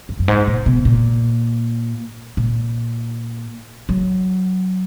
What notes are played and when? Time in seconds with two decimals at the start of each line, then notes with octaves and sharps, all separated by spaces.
0.09 F#2
0.19 F#2
0.28 G#2
0.47 A#2
0.66 B2
0.85 A#2
2.37 A#2
3.89 F#3